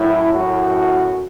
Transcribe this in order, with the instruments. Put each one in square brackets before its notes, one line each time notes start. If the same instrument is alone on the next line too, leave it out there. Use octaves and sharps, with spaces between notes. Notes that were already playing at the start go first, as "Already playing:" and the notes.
Already playing: [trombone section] F#2 A2 [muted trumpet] E4
[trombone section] F#2 A2 [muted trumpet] F#4